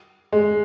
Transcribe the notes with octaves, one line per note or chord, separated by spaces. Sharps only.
G#3